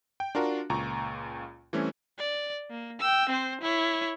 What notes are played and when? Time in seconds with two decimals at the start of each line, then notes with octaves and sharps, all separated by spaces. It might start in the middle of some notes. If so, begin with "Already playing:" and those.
0.20 G5
0.35 D4 F4 F#4 A#4
0.70 C#2 A#2 A#5 C#6
1.73 E3 G3 A3 C4 C#4 E4
2.19 D5
2.71 A#3
2.99 G5 E6
3.30 C4 C5
3.61 E4 C#5